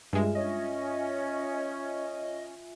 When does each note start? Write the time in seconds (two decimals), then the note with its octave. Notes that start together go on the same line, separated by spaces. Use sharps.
0.13 G2 G#3 F4 E5 G#5
0.35 C#4 D#5